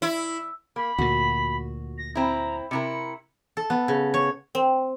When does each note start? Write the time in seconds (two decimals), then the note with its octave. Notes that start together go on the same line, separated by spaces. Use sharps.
0.02 E4
0.76 A#3 B5
0.98 D2 A#2 F#4
1.98 A#6
2.15 C4 E4 A#5
2.71 C3 E4 A#4 C#7
3.57 A4
3.70 B3
3.88 C#3
4.14 C#5
4.55 C4